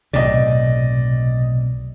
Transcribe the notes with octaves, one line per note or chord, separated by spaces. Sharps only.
B1 A2 C3 D5 D#5